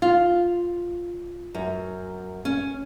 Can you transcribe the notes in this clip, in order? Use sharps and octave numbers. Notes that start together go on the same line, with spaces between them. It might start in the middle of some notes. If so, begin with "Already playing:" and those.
F4
F#2
C#4